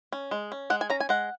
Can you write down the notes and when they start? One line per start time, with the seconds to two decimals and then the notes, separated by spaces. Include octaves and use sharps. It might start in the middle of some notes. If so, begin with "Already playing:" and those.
0.12 C#4
0.31 G#3
0.52 C#4
0.70 G#3 F#5
0.81 G#5
0.90 C#4 A#5
1.00 G#5
1.09 G#3 F#5